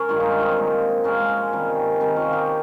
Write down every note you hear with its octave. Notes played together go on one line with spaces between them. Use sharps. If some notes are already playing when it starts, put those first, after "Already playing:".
Already playing: C#4 A#4 C#5
G2 D#3 G#3 F4
D#4
C#4
C4 D#4
A#2 F3 G#3
A#2 F3 G#3 C#4
C#4
C3 D#3 G3
C3 D#3 G3
C#4 F4
D#4 G4